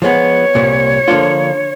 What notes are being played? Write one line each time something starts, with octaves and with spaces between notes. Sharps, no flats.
F3 G#3 B3 C#5
C2 A#2 G3 C4
D3 F3 A#3 D4 F4